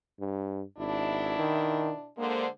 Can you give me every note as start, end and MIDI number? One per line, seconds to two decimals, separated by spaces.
0.20 0.62 43
0.78 1.35 32
0.78 2.09 47
0.78 2.09 62
0.78 2.09 64
1.38 1.91 51
2.17 2.47 50
2.17 2.47 56
2.17 2.45 58
2.17 2.47 72